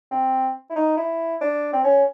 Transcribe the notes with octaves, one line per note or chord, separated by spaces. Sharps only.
C4
E4
D#4
E4
D4
C4
C#4